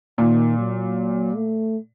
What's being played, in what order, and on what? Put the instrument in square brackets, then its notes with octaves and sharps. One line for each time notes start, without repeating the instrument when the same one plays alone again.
[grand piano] A#2 [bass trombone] D#3
[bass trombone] F#3
A3